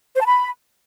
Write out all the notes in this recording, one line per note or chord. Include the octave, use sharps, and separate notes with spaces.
C5
A5
B5